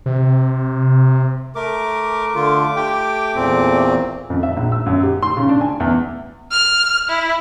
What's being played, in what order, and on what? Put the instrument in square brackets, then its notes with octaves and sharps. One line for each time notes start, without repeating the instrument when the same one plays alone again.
[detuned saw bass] C3
[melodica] A3 D6 [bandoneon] A#4
[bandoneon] D3 F4
G4 G5
E2 A#2 C4
[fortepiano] F2
E5
A#1
E6
F#2
G4
C6
C#3
D4
G#5
E2
[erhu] F6
E4